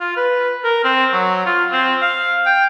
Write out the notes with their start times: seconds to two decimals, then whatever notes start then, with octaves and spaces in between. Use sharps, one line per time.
0.01 F4
0.17 B4
0.65 A#4
0.84 C4
1.13 F#3
1.46 F4
1.72 C4
2.02 F5
2.46 G5